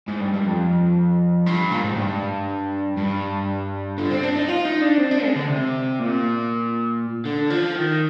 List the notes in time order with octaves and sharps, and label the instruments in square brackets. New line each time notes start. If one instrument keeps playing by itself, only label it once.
[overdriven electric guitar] G#2
G2
G2
F2
G2
A#2
G#2
G2
G2
D3
C4
D4
D#4
F4
D#4
D4
C4
D4
G#3
D3
C3
A#2
D3
F3
D#3